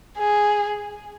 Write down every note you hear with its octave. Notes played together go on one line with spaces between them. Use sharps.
G#4